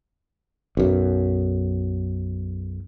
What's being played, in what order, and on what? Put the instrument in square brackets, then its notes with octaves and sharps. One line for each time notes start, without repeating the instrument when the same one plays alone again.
[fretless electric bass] B1 F#2